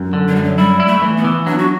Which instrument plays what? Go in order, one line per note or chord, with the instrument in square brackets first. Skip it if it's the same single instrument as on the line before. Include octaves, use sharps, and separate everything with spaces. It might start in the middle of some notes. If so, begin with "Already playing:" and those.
Already playing: [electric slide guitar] F#2
D3
[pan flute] F#3
[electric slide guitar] F#2 [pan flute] G3
[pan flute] F#3
[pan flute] G3 [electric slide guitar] E4
[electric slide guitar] E4
[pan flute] A3
[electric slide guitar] E3
[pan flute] B3
[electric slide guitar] E3
[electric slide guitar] F#3 [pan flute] D4
[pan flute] F#4